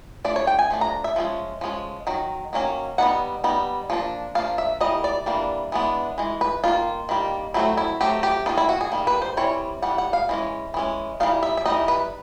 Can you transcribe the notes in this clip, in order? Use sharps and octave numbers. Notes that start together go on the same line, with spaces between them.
F3 A3 D4 D5
C#5
G5
G#5
F3 A3 D4
A#5
E5
F3 G#3 C#4
F3 G#3 C#4
D#3 F#3
D#3 F#3 A#3 C#4
G3 B3 D#4 F#5
G3 B3 D#4
F3 A#3 D4
F3 A#3 D4 F5
E5
E3 G3 A#3 D#5
D5
E3 G3 A#3 D4
E3 G#3 B3 D4
E3 G#3
B4
D#3 G3 A#3 F4
D#3 G3 A#3
F#3 A3 C4 E4
E4
F#3 A3 C4 G4
G4
D#3 G3 A#3 F4
E4
F#4
G#4
D#3 G3 A#3
B4
C5
E3 G3 C4 C#5
E3 G3 F#5
F#5
F5
E3 G#3 C#4
E3 G#3 C#4
E3 G3 C4 D#4 F5
E5
E5
E3 G3 C4 D#4 D#5
B4